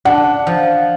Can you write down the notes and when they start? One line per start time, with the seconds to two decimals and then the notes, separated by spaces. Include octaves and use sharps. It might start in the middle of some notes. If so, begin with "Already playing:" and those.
0.05 D4 F#5
0.47 F3